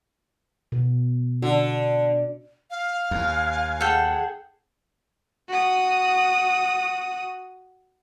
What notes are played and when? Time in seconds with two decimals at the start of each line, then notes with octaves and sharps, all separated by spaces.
0.72 B2
1.42 D3 F#4
2.71 F5
3.11 D#2 G#5
3.81 G#4 A4 F#5 G5
5.49 F#4 D#6